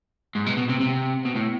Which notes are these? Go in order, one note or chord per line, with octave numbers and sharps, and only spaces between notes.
G#2
B2
B2
C3
C3
B2
A2